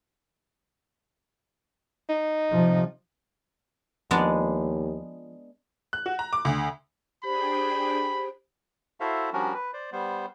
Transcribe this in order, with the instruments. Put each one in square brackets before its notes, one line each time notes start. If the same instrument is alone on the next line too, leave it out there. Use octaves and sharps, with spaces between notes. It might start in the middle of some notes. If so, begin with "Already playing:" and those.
[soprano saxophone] D#4
[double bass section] C3 F3
[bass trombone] D#2 [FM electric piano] F3 [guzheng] G#3 B3 D4
[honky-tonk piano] F#6
F#4
A#5
D6
D2
[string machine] D4 G#4 G5 [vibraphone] G4 C5 [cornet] B5
[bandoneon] E4 F#4 A4 C5 E5 F5
F3 G3 C#4 D4 F#4 A#4
B4
C5 D5
G3 B3 C5